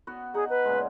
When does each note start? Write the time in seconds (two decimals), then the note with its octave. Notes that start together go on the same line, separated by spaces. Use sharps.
0.07 B3 F#4
0.34 D#4 G#4 F#5
0.50 B4
0.65 A#2 C#3 G#3